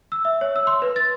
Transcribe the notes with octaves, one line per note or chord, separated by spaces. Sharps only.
E6
E5
C#5
E6
C6
B4
A6